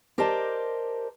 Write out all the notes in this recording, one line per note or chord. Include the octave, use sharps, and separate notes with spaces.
G4 A#4 C5 D5 D#5 A5